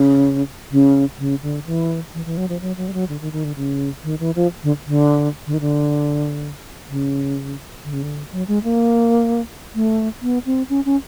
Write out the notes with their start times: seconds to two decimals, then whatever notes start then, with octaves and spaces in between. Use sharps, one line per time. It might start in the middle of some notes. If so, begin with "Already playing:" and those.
Already playing: C#3
0.71 C#3
1.19 C#3
1.42 D3
1.66 E3
2.14 E3
2.26 E3
2.37 F#3
2.49 F3
2.61 F#3
2.77 F#3
2.88 G3
2.93 F#3
3.09 D3
3.21 D#3
3.32 D#3
3.44 D3
3.56 C#3
4.04 D#3
4.20 E3
4.36 F3
4.63 D3
4.87 D3
5.47 D3
5.54 D#3
5.60 D3
6.89 C#3
7.84 D3
7.93 C#3
8.03 D3
8.32 F#3
8.48 G#3
8.64 A#3
9.75 A3
10.22 B3
10.46 C4
10.70 C#4
10.85 C#4